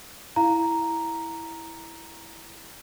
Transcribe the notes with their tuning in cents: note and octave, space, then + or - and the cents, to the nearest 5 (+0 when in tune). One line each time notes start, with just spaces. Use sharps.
E4 +0 F5 +0 A#5 +0